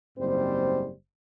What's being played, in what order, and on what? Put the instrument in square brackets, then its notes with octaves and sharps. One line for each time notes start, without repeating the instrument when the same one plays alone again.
[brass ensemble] F#1 G#2 G3 C4 C5